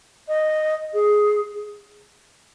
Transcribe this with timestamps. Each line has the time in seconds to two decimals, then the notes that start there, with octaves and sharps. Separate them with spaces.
0.27 D#5
0.93 G#4